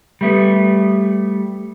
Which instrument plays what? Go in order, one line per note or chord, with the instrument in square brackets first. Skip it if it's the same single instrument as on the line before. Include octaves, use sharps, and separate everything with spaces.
[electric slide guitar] G3 A3 B3